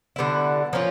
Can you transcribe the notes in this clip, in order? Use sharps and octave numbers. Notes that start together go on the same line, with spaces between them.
D3 G3 B3 E4
F3 A#3 C#4 F4